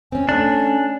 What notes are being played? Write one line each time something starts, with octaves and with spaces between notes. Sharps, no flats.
C4 C#4 G#5
A3 C#4 D4